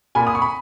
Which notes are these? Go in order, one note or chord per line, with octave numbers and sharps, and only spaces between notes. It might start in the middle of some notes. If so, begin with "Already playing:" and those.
A#2 G#5 B5
D#6
C#6
B5